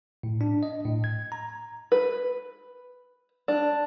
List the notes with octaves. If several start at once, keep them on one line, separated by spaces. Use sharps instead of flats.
A2
D4
D#5
A2
G#6
A#5
B4
D4